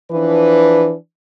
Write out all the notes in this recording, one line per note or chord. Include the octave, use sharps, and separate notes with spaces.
E3 F3 D4 B4